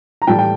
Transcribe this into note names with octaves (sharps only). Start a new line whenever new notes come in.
A#5
A2 E3 G3 G5 A5
G5